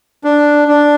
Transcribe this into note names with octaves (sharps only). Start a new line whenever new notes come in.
D4
D4